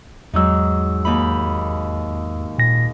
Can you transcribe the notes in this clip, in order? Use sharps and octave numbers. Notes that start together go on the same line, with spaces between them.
E2 G#2 F#3 D#4 E6
D#2 D#4 B5
A#2 A#6